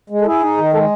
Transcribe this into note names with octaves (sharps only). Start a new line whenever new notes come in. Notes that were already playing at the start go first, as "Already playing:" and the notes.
G#3
A4
E4 G#4
D#4
D#3
G#3 A4